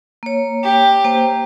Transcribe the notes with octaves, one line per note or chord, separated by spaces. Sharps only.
A#3 C#5
G4
A#3 C5